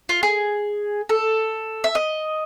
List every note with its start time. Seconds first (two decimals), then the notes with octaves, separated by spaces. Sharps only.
0.09 F4
0.23 G#4
1.09 A4
1.84 E5
1.95 D#5